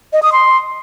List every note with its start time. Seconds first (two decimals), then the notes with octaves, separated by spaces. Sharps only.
0.13 D#5
0.23 D#6
0.32 C6